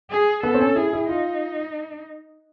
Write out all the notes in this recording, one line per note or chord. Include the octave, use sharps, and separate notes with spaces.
G#4
B3 A4
C4
C#4
E4 G#4
E4
D#4 F4